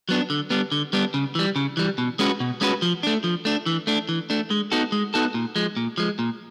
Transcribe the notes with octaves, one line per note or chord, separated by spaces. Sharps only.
F#3 B3 D4
D3
G3 B3 D4
D3
G3 B3 D4
C#3
E3 G3
C#3
E3 G3
B2
G#3 C#4 F#4 B4
B2
G#3 C#4 F#4 B4
F3
A3 D4
F3
A3 D4
E3
A3 D4
E3
A3 D4
G#3
B3 D#4 F#4 A4
G#3
B3 D#4 F#4 A4
A#2
F3 G#3
A#2
F3 G#3
A#2